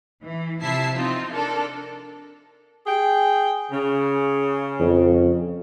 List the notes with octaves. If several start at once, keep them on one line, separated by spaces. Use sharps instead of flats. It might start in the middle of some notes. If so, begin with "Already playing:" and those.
E3
C3 F3 E4 E5 A5 C7
C4 D#4 F4
D4 A4 A#4
G#4 G5
C#3
F2